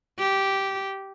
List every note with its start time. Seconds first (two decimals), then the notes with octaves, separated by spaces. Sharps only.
0.19 G4